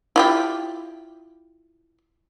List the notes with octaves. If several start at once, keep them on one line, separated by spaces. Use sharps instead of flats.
E4 F4 G4